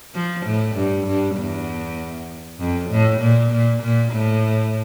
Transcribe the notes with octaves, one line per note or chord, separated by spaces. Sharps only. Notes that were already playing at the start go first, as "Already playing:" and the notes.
F3
A2
G2
G2
E2
F2
A2
A#2
A#2
A#2
A2